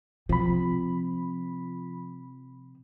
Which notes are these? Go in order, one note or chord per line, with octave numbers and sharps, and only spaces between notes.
C3 F3 B5